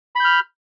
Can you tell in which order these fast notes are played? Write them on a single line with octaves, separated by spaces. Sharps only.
B5 G6 F6